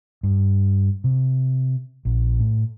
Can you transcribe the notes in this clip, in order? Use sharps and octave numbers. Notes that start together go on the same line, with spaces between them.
G2
C3
A#1
A2